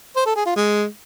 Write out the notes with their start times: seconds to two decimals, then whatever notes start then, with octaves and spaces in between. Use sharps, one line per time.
0.16 C5
0.26 A4
0.36 G#4
0.46 F4
0.56 G#3